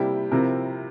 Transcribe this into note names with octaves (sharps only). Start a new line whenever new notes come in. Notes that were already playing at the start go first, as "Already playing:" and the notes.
Already playing: C3 G3 A#3 E4 G4
C3 F3 C4 E4 A#4